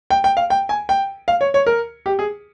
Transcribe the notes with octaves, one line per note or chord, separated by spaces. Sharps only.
G5
G5
F5
G5
G#5
G5
F5
C#5
C#5
A#4
G4
G#4